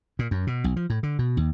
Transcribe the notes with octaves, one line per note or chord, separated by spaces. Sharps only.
A#2
F#2
B2
B1
F3
A2
D3
B2
D#2